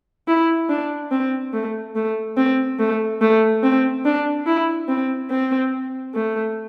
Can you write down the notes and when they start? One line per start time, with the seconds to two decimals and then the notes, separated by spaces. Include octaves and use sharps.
0.28 E4
0.69 D4
1.11 C4
1.53 A3
1.95 A3
2.37 C4
2.79 A3
3.21 A3
3.63 C4
4.05 D4
4.46 E4
4.88 C4
5.31 C4
6.14 A3